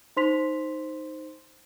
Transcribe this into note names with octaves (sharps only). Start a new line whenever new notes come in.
D#4 C5 C6 B6 F7